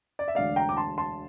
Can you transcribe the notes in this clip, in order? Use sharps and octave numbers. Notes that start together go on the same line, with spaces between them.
D5
E5
E1 D2 D3 D5 F5
G5 A#5
D6
A5 C6
A5 C6